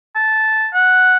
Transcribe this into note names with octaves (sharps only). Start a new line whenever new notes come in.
A5
F#5